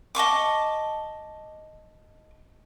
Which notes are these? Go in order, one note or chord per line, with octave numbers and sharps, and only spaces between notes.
D#5 A5 C#6 D6